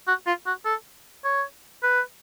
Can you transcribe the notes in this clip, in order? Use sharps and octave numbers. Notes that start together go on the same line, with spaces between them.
F#4
F4
F#4
A4
C#5
B4